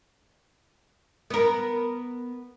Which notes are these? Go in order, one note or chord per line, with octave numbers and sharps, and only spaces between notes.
B3 A#4